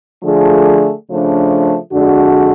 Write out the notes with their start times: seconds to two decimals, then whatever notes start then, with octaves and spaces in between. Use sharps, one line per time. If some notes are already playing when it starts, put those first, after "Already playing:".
0.23 D3 F3 A3 D4 G#4
1.08 C#3 F3 A3 D4
1.92 F2 D3 G#3 D4 F#4